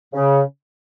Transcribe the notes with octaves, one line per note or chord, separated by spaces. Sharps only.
C#3